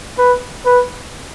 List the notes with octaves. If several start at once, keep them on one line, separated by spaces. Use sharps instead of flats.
B4
B4